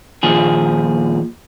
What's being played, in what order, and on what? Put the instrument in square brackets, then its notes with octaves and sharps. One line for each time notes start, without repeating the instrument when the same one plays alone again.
[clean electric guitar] D#2 A#2 F3 G#4